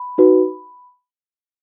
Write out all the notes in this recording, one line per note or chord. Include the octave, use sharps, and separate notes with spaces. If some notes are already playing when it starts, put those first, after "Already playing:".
Already playing: B5
D#4 F#4 B4